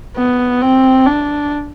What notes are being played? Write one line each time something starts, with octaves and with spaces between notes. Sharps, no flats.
B3
C4
D4